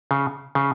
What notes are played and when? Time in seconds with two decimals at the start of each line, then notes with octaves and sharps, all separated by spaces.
0.11 C#3
0.55 C#3